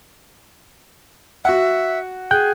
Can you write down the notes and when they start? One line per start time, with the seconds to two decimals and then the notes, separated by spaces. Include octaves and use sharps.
1.45 F#4 E5 F#5
2.31 G#4 G5 F#6 G6